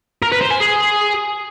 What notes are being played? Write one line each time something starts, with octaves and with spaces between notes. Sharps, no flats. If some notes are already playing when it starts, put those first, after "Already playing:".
A#4
B4
C5
G#5
G#4